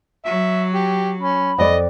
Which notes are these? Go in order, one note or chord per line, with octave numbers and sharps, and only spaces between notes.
F#3 E5
G4
C#4 B5
F2 D5 D#5